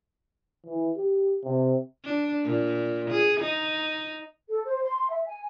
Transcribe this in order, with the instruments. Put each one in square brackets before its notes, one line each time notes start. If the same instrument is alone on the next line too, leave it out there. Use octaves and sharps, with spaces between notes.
[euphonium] E3
G4
C3
[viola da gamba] D4
A#2
G#4
D#4
[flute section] A4
C5
C6
E5
G#5